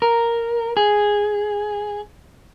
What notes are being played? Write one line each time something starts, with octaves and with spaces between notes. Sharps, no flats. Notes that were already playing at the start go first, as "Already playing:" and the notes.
A#4
G#4